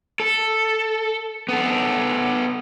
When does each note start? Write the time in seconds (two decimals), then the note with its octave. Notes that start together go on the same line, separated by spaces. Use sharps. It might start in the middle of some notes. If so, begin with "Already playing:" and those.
0.20 A4
1.49 B3 A4